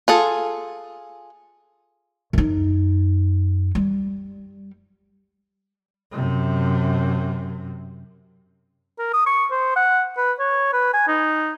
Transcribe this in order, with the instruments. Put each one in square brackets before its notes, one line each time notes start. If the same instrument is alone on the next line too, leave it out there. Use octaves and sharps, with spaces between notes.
[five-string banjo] F4 G#4 A4
[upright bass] F#2 D#4
G3
[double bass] F#2 C3
[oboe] A#4
D#6
C#6
C5
F#5
B4
C#5
B4
G#5
D#4